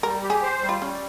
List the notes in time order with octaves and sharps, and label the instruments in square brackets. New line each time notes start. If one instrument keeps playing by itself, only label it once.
[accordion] G3 [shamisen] A#4
[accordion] G4
[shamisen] G#4
[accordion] C5
G3
[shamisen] F4
[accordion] G3 [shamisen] C#4